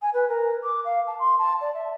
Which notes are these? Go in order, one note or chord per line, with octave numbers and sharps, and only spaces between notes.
G#5
B4
A#4
D6
F5
A5
C6
A5
D5
E5